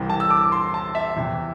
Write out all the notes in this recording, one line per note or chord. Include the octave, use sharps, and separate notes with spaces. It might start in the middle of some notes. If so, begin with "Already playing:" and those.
Already playing: C2 C3 E3
A5
E6
D6
C6
A5
E5
E2 C3 E3